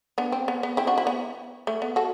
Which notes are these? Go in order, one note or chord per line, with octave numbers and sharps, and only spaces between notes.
B3 D4
C4
B3
B3
C4 E4
D4 F#4
C4 E4
B3
A3
B3
F#4 A4